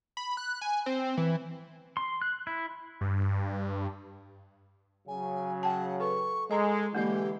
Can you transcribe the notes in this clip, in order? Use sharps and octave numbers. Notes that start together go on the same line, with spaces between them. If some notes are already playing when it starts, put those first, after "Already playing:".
B5
F#6
G#5
C4
E3
C6
F#6
E4
G2
C#3 F#3 G#5
F#5 G5 A5
A4 B4 C#6
G#3 A4 D#5 A#5
D3 E3 G#3 A#3 G4 D#5